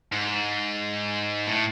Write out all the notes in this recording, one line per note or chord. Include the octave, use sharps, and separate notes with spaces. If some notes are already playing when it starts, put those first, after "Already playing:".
G#2
A2